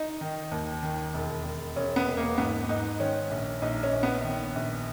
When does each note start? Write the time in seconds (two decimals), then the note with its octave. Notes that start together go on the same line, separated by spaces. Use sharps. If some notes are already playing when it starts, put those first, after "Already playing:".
Already playing: D#4
0.21 D#3
0.51 D#2
0.83 D#3
1.14 E1
1.45 E1
1.76 E1 C#4
1.96 B3
2.07 E1
2.17 A#3
2.38 G#2 B3
2.69 G#2 D#4
3.00 D#3 C#4
3.31 A#1
3.62 A#1 D#4
3.83 C#4
3.93 A#1
4.03 B3
4.24 D#3
4.56 A#1